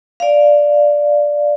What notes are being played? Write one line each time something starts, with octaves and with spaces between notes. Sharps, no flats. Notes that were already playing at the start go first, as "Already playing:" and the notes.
D5 F5